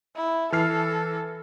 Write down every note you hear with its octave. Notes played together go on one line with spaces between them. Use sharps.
E4
E3 A4 F6 C7